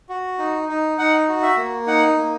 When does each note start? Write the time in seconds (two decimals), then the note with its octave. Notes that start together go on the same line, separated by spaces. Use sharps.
0.09 F#4
0.39 D#4
0.69 D#4
0.98 D#4 F#5
1.28 F#4
1.42 E5
1.57 A#3
1.87 D#4 F#5
2.17 A#3